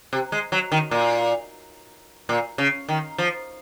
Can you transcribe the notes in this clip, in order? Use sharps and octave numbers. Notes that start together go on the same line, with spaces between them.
C3
G#3
F#3
D#3
A#2
A#2
C#3
D#3
F3